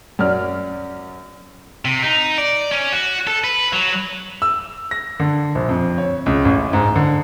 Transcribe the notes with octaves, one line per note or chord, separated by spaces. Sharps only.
F#2 C#4 D5 F6
C3
D#4
D5
C#4
F#4
A4
B4
F#3
E6
A#6
D3
A#1
F2
C#5
C#2
A1
G#2
D3